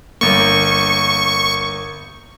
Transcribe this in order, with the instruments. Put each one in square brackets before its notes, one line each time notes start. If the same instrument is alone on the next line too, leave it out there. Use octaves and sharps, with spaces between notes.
[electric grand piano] G1 A#3 [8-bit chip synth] C#6